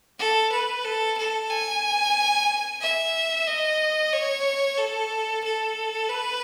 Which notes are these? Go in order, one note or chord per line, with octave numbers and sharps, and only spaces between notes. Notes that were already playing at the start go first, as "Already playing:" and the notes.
A4
B4
A4
A4
G#5
E5
D#5
C#5
A4
A4
B4